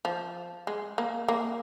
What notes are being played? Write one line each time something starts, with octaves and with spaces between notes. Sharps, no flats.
F3
G#3
A#3
A#3